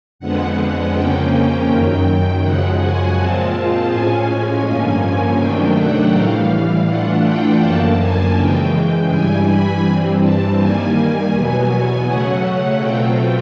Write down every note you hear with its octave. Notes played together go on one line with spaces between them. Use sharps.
F2 D3 F3 G#3 B3 F#5
F2 C#3 F3 A#3 C#4 G5
F#2 D#3 F#3
F#2 C#3 F3 G#3 F#5
G#5
A#2 F3 G#3 C4 F4 A5
A2 F3 G#3 C#4 G#5
G2 D3 F3 A#3 C#4
C3 D#3 F#3 A3 D4 G5
F#5
A2 E3 G3 F5
F5
E3 A3 D4 F4 F#5
G5
F#2 D3 F3 A#3 A5
G#5
C#3 E3 G#3 G5
G2 E3 G3 G#5
B5
G2 E3 G3 C4
A5
D#3 G3 A#3 G#5
E2 B2 F#3 B3
C#3 F#3 A3 C#4 F#5
B2 F#3 A3 C4 F4 G5